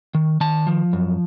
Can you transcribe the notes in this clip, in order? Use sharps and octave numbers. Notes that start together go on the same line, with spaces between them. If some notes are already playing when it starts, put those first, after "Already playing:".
D#3
D#3 A5
F3
F#2